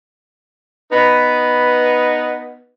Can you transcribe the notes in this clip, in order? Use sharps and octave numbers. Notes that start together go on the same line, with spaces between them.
B3 D#4 B4